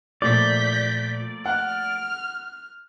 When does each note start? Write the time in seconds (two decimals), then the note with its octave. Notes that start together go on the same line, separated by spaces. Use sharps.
0.22 A#2 F3 A3 A#3 D5 G6 B6
1.46 F#5 F6 F#6